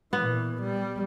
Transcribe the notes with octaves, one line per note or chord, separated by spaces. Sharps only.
A#2 E3 B3
G3